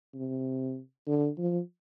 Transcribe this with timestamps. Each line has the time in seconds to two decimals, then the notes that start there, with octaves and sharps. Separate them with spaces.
0.14 C3
1.07 D3
1.38 F3